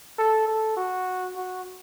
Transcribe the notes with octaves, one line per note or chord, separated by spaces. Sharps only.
A4
A4
F#4
F#4